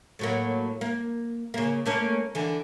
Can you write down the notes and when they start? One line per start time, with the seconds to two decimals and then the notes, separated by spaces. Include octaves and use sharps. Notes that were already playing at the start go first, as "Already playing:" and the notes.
0.19 A2 F#3 A#3
0.81 A#3
1.54 C#3 A#3
1.86 A3 A#3 C#4
2.35 D3 E3